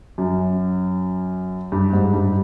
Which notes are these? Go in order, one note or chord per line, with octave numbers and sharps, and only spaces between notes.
F#2
G2
G#2
G2